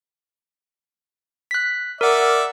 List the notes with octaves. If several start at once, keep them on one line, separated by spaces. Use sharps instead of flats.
F#6 B6
A#4 D5 E5 F#5